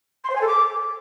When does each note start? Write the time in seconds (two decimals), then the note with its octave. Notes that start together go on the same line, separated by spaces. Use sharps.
0.24 C6
0.29 C5
0.35 G#5
0.41 A4
0.47 D6